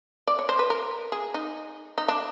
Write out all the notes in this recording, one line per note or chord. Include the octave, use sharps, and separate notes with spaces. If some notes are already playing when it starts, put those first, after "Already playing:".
D5
C#5
C5
B4
A#4
G#4
D#4
D#4
D4